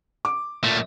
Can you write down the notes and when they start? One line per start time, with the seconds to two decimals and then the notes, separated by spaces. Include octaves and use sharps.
0.25 D6
0.63 A#2 A3